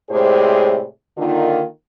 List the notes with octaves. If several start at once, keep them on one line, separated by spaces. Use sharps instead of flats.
A2 C3 G#3 G#4 C5 D5
D3 D#3 A#3 D#4 F4